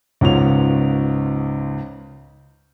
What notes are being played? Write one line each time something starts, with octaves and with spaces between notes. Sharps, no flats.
C#2 G#2 B3 C#4 F4 F7